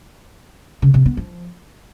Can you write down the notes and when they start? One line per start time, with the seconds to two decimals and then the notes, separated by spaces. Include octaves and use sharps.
0.82 C#3
0.94 C3
1.06 B3
1.17 F3